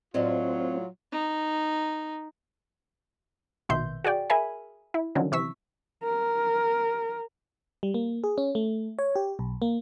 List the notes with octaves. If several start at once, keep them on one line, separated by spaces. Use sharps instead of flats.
A2 F#3 C4 F4 D5 D#5
D#4
A#1 B2 D#3 E5 C6 G6
F#4 G#4 D5 G5
G#4 A#4 E5 G#5 B5
E4
D3 D#3 F3 F#3 C#4
C3 E3 C#6 E6 B6
A#4
G3
A#3
G#4
C#4
A3
C#5
G4
B1
A#3